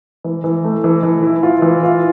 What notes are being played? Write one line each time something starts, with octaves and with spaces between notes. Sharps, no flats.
E3
E3
A3
E3
E3
E4
F4
E3
F4